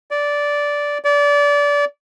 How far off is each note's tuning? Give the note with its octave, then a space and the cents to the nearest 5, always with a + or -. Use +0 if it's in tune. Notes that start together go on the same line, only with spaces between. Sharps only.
D5 -10
D5 -25